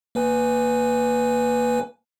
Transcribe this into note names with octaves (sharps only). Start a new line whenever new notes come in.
A#3 B4 G#5